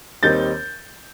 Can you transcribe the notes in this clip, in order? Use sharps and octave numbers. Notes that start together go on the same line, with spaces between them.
D#2 D#3 G3 C4 D#4 G6 A6